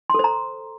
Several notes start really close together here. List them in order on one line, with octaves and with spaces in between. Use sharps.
C6 A4 C5 A#5